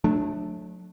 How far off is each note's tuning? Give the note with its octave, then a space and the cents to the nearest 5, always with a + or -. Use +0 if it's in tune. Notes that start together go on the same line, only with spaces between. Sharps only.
F#3 -35 A3 -10 D4 +10